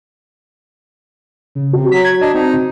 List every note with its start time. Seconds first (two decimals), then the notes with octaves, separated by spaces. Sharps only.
1.55 C#3
1.73 C3 F#4
1.92 F#3 B6
2.05 G#6
2.21 D4 D#5
2.34 C4 D#4